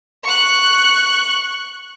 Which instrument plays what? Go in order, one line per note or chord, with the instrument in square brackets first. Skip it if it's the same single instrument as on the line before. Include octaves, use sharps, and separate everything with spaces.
[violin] C#6 F#6